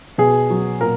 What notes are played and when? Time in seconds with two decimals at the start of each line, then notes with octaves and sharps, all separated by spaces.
0.18 B2 G#4
0.50 F#3
0.80 A#2 A#4